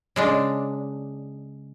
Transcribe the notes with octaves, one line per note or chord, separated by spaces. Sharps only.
C#3 G#3 D4